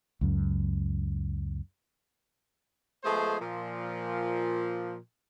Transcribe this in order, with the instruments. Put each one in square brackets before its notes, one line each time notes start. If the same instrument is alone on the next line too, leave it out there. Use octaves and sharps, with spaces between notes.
[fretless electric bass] C#2 F#2
[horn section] F3 G#3 A3 B3 G#4 C5
A#2 F3